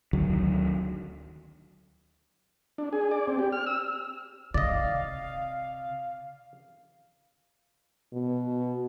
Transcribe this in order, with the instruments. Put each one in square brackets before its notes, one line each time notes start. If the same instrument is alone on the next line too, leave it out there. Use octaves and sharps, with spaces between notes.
[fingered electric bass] D2 D3 D#3 F#3
[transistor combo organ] D4
G#4
D5
C4
G4
F6
E6
[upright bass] C3 [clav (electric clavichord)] D5 D#5 [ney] F5
[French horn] B2